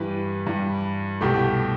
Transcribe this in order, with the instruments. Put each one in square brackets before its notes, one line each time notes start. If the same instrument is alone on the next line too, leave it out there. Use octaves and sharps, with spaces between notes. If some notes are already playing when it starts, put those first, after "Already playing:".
Already playing: [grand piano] G2 E3 G3 B4
G2 E3 G3
C2 B2 A3 G4